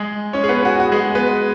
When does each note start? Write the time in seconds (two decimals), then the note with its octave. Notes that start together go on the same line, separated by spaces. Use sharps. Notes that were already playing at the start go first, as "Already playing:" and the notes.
Already playing: G#3 G#4
0.33 C#4 C#5
0.44 G#4
0.49 B3 B4
0.65 F#4
0.80 F#4
0.92 G#3 G#4
1.15 B3 B4